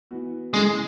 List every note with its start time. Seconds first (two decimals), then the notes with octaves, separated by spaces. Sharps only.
0.11 E3 B3 F#4
0.54 C#3 E3 G#3 A3 C#4 G#4